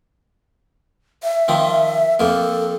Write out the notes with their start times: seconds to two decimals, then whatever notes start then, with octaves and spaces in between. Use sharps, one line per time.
1.23 E5
1.48 D#3 F3 C4
2.20 F2 A#3 A4